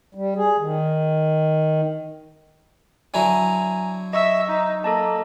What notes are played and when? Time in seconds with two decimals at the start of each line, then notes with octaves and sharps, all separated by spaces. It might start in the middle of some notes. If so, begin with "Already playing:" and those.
0.15 G3
0.36 G#4
0.59 D#3
3.14 D3 F#3 E4 G#5 A#5
4.13 D#5 E5 C#6 E6
4.49 D#4
4.84 A#3 A4 D#5 A5